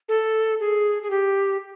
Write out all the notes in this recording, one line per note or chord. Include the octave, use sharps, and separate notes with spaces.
A4
G#4
G#4
G4